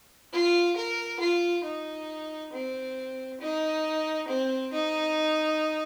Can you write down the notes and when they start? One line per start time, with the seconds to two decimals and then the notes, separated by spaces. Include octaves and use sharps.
0.33 F4
0.76 A#4
1.20 F4
1.64 D#4
2.53 C4
3.41 D#4
4.29 C4
4.73 D#4